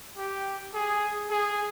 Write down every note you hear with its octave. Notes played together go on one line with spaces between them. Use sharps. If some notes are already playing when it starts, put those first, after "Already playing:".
G4
G#4
G#4